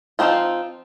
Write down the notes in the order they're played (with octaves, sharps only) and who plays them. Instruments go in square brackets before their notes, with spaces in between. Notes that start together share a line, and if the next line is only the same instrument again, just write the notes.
[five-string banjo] F3 F#3 C4 D#4 F4